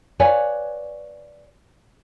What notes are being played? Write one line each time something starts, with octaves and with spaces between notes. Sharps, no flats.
B4 C#5 D5 F5 G#5